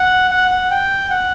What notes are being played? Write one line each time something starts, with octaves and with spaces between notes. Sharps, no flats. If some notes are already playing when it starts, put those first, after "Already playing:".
Already playing: F#5
F#5
F#5
G5
F#5